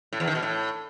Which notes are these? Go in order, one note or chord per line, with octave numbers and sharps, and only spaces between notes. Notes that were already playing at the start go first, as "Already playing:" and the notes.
A2
E2
D#3
B2
A2